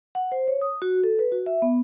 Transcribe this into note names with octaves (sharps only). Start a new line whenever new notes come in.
F#5
C5
C#5
D#6
F#4
A4
B4
F#4
E5
B3